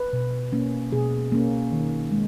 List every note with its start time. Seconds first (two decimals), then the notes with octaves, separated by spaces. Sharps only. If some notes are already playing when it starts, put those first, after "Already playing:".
Already playing: B4
0.13 B2
0.53 A#3 C#4
0.92 B2 G#4
1.32 A#3 C#4
1.72 D#3
2.12 G#3